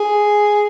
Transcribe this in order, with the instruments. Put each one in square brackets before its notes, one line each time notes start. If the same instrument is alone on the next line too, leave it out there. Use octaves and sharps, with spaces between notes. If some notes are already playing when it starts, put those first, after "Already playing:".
Already playing: [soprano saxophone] G#4